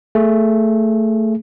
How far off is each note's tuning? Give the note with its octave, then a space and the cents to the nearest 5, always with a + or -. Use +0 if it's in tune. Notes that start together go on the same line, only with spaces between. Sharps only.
A3 +15 G#4 +15